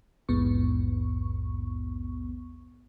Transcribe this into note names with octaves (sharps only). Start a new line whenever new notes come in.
A#1 E2 G#2 B3 C#6